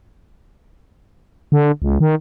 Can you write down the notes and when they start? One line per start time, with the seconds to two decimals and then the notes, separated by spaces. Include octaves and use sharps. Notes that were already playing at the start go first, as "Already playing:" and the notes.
1.52 D3
1.82 C#2
2.00 D#3